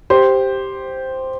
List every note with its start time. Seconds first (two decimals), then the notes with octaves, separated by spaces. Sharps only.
0.10 G4 C5